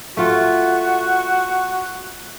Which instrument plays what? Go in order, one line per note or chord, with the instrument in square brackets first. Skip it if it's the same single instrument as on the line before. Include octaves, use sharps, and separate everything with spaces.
[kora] A3 F4 [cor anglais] F#4